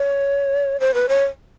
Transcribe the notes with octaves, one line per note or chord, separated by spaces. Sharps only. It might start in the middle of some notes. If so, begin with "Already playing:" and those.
Already playing: C#5
C5
B4
C#5